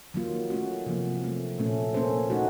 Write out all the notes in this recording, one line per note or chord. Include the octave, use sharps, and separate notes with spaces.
D#3 F#3 A#3 F4
A3 C#4 F#4
C3 F3 A#3
F#3 A3 C4
A#2 A3 C#4
A#3 C#4 A4 C5
A3 D#4 F#4